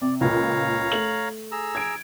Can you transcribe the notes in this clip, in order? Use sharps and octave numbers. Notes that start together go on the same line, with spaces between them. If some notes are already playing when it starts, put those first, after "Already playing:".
C3 D5
C#2 A#2 C#5 F5 A#5
A3 F#7
G#4 A#5 E6
G#6 D7